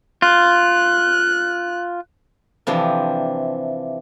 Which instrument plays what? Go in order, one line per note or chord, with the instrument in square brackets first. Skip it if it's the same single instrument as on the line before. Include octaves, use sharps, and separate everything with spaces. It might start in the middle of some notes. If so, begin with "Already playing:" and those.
[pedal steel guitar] F4 [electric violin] F#6
[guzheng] C3 E3 F3 D4